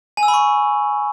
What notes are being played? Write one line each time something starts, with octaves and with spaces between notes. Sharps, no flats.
G#5
E6
B5
C#6